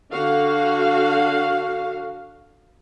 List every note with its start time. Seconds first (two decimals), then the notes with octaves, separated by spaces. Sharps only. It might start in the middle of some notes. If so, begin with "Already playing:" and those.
0.12 D3 F#4 F5